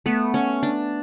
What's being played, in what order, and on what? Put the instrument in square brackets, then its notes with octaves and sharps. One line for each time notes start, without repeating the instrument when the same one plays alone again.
[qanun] A3 [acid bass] B3
[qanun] C#4
D4